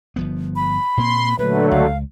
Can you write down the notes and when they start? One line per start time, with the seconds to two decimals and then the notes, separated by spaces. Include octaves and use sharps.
0.16 G1 F3 B3
0.56 B5
0.97 A#2 A#3 C4 C6
1.39 A#2 D3 F#3 A3 B4
1.72 C#2 F5